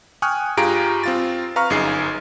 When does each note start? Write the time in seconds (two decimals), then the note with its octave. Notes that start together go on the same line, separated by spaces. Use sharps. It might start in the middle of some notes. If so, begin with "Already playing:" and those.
0.22 G5 G#5 C#6 D#6 F6 F#6
0.57 G2 F4 G4 G#4 A#5 D7
1.04 C4 F4 A6
1.56 B4 F5 A#5 C#6 F6
1.70 G1 F#2 D#4 G#4 C7